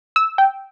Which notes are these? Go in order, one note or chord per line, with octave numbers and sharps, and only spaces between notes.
E6
G5